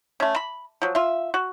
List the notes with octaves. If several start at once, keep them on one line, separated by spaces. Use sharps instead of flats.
A3 C#4
B5
F3 F#3
F4 E5
F#4